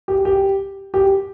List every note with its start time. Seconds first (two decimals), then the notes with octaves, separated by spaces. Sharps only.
0.08 G4
0.25 G4
0.94 G4